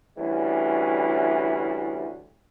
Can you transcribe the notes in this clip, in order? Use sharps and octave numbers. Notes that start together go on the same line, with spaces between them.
D2 E3 G3 C#4